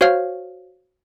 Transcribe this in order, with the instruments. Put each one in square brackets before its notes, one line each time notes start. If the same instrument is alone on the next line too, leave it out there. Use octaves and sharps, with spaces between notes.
[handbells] F#4 C5 C#5 F5 F6